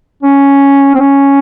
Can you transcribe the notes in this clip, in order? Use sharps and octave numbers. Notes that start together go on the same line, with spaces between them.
C#4
C4
C#4